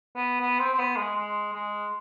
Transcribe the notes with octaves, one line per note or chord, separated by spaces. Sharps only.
B3
B3
C4
C4
B3
G#3
G#3
G#3